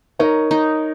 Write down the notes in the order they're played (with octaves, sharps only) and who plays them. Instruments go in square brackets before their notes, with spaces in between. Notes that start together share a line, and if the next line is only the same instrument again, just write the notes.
[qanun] D#4 [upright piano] A#4 C#5
[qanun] D#4